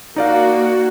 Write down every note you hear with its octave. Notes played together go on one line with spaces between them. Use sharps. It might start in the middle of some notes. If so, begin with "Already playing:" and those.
A#3 D#4 F#4 D5 F5